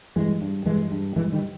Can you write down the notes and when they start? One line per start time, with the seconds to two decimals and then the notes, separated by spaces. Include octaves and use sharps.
0.16 G2 E3 G#3
0.41 G2
0.66 G2 E3 G#3
0.91 G2
1.16 G2 E3 G#3
1.33 D#3 G3